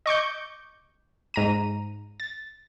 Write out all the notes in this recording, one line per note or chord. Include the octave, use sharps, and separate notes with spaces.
D#5 C#6 D6 G6
G#2 A#5 D#7
A6